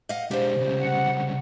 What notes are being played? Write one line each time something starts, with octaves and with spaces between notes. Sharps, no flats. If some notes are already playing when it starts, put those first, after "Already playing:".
D#5 F5 F#5
G#3 D4 G4 C5
C2 C#3
F#5